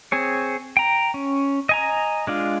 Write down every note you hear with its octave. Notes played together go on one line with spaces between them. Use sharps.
C4 G#4 C#5
G5 A#5
C#4
D#5 G#5 A#5
G#3 D4 F4